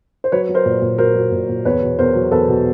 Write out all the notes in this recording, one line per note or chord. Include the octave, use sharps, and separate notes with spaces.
C5
F#3 B4 C#5
F#3
A#4 C5
A#2
A#2
F#3 A#4 C5
F#3
A#2
A#2
E2 B4 C#5
B2
E2 A#4 C5
F#3
E2 A4 B4
B2